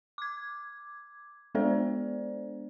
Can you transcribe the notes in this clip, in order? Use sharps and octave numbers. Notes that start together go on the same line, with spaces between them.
D6 G#6
G#3 B3 D4 A4 C5 D5